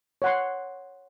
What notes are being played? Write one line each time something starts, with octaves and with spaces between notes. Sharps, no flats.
C#5 F#5 C6